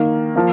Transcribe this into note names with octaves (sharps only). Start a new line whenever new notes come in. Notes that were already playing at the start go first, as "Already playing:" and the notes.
Already playing: D#3 A#3
F3 A#3